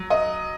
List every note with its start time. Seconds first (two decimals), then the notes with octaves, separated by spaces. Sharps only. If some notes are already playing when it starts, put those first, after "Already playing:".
Already playing: F#3
0.10 D#5